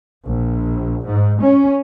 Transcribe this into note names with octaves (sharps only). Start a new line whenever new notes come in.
A#1
G#2
C#4